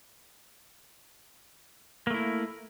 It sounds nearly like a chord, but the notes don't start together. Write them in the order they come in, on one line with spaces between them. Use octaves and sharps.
A#3 A3 E4